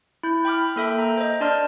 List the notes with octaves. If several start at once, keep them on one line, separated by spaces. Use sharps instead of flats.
E4 G6
G5 B5 D6 F6
A#3 A4 E5 G5
A#5
C5 D#5
D4 D5 A5 C6 F6